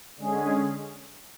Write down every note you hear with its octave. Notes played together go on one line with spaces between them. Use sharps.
D3 G#3 C#4 G#4